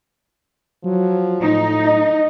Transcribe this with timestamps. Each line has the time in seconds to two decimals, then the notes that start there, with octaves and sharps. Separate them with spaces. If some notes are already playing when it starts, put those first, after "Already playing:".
0.84 F3 F#3
1.41 A2 D#4
1.85 D#5